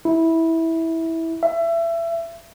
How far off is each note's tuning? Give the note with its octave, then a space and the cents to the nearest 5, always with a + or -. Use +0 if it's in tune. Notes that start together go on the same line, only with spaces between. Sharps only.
E4 -15
E5 +25